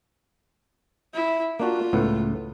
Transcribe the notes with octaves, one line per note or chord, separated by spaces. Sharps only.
E4
A#3 D4 F4 F#4
C#2 A2 B3